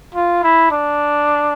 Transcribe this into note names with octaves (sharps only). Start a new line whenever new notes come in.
F4
E4
D4